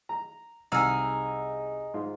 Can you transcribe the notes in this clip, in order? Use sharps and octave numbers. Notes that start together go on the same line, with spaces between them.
A#5
C2 D#4 G#4 E6 F6
G#2 F4